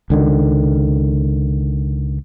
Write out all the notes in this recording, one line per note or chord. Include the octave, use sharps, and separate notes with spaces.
C#2 D3 D#3